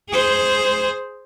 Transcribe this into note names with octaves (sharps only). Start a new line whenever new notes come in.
G#4 C5